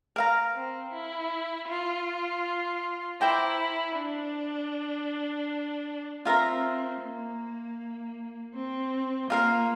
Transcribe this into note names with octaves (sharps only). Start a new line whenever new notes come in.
A#4 F5 A#5
C4
E4
F4
E4 C5 G5 A#5 D6
D4
C4 F4 A#4 E5 A#5
A#3
C4
A#3 F4 A#4 F5